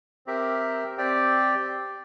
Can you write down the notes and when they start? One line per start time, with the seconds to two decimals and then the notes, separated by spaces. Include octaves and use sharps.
0.26 C4 G4 A#4 E5
0.98 C4 G4 D5 G5